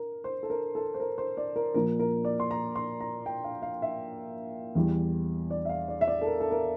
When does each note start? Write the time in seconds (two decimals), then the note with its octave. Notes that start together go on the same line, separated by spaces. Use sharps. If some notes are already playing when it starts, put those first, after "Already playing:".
Already playing: A#4
0.24 C5
0.43 A4
0.50 A#4
0.75 A4
0.94 C5
1.00 A#4
1.18 C5
1.37 D5
1.56 A#4
1.74 A#2 F3 A#4
1.99 A#4
2.25 D5
2.40 C6
2.51 A#5
2.76 C6
3.01 A#5
3.26 G5
3.44 F5
3.62 F5
3.82 E5
4.75 E2 E3 G3
5.50 D5
5.65 E5
5.69 F5
5.88 D5
6.01 E5
6.07 D5
6.22 A4
6.27 A#4
6.40 A4
6.51 A#4